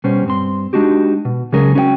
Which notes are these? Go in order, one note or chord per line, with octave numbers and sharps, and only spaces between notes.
B2 G3 C#4 C5
G2 C4 C6
G#3 D4 D#4 F#4 G4
B2
C#3 F#3 G#3 C#4 G#4 A#4
C#4 F#4 C#5 G5